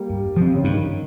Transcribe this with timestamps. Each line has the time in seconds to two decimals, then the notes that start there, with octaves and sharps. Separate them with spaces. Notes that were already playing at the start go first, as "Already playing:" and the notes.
Already playing: G3 A#3
0.10 G2
0.36 F3 C4
0.54 C#3
0.64 G2 D#3